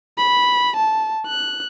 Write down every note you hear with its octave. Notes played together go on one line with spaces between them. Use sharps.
B5
A5
F#6